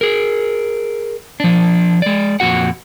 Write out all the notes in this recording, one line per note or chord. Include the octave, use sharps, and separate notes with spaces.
G#4 A#4
F3 D4
G#3 D5
F2 A#2 F#4 F#5